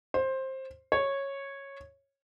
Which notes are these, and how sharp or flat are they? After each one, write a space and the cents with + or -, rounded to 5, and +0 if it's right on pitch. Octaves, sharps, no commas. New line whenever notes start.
C5 +15
C#5 -10